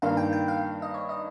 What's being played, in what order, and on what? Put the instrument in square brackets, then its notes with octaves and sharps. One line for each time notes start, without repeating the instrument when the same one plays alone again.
[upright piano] G2 D#3 A#3 [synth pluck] F5
[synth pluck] G5
G5
F5
D#5
C#5
D#5